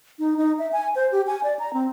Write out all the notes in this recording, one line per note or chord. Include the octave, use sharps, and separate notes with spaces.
D#4
D#4
E5
G#5
C5
G4
G#5
D5
A#5
C4